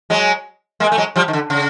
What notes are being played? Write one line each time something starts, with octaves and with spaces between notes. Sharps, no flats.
F#3 G#3
G#3 A#3
A3
F#3 G#3
F3 G3
D#3
D3
C#3